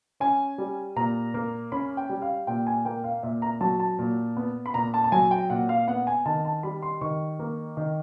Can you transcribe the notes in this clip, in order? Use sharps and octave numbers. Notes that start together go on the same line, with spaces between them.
C#4 G#5
G3
A#2 A#5
A#3
C#4 B5
G5
G3
F5
A#2 G5
G#5
A#3 G5
F5
A#2 E5
A#5
F#3 A5
A5
A#2
B3
B5
A#2 A#5
A5
A5
F#3 G#5
G5
A#2 F#5
F5
B3 F#5
G#5
D#3 A5
A5
G3 B5
C6
D#3 C#6
A#3
D#3